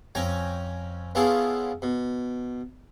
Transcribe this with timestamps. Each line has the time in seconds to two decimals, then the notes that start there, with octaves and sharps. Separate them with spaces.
0.15 F2 C#4 G5 G#5 A#5
1.15 B3 C#4 E4 F4 G#4 A4
1.82 B2